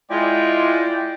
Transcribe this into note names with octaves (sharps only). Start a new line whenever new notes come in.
G#3 E4 F4 D5 G5